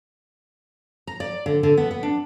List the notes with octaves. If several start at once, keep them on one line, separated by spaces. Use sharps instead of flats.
A#5
D5
D3
D3
B3
B3
D4